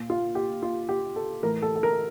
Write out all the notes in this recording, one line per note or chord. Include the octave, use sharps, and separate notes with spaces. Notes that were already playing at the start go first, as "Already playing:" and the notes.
Already playing: A#2
F4
G4
F4
G4
A4
A2 E3 A#4
A4
A4
A#4